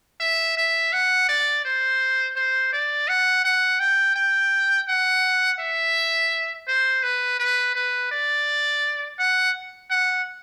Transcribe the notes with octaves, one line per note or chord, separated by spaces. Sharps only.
E5
E5
F#5
D5
C5
C5
D5
F#5
F#5
G5
G5
F#5
E5
C5
B4
B4
B4
D5
F#5
F#5